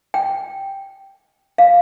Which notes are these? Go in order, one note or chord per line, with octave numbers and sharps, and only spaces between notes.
G5
F5